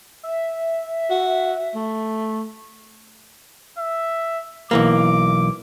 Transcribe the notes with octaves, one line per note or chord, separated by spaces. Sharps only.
E5
F#4
A3
E5
B1 E3 A#3 D6